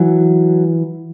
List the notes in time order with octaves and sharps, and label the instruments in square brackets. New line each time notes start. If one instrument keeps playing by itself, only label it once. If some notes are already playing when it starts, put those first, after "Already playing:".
Already playing: [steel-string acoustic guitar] E3 F#3